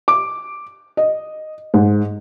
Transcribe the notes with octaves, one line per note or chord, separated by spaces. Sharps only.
D6
D#5
G#2